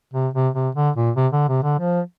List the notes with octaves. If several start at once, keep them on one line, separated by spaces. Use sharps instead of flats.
C3
C3
C3
D3
A#2
C3
D3
C3
D3
F3